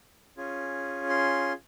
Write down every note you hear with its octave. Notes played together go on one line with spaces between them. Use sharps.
C#4 F4 G#4
C6